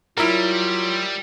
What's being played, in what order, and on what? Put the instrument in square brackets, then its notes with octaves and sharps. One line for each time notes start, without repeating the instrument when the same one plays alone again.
[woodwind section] F#3 F4 [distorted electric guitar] G3 [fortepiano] E4 A#4